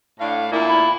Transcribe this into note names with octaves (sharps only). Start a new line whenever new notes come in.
A2 D4 F5
E2 A#2 A#3 E4
B5